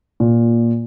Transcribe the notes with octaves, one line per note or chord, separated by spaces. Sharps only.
A#2